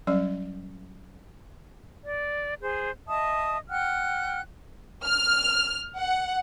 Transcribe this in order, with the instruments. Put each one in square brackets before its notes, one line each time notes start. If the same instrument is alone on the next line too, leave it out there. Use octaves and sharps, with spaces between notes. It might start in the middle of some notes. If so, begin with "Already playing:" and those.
[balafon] F#3 G3 C#4 D5
[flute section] D5
G#4 C5
D#5 E5 A5 D#6
F#5 G5 F6 F#6
[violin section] F6
F#5